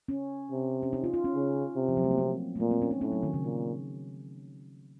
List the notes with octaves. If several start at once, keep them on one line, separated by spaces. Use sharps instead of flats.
C#4
C3
C#4
D#4
F4
F4
C#4
C#3
C3
F3
F#3
A3
A#3
C4
A3
A#2 A#3
C4
C#4
D#4
A2 C#4
F#3
D#3
C#3
A#2 D#3